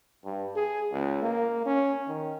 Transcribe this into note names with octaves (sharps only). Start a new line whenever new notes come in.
G2
G#4
C#2
A#3
C#4
D#3